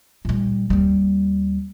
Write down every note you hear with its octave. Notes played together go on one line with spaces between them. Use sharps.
A#2 G3
D#2 G3